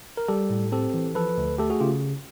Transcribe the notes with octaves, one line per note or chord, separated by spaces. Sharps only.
A#4
G3 G4 A4
A2
C4 G4 A4
E3
F3 A4 B4
D2
A3 G4 A4
F#4 G#4
C#3 F4 G4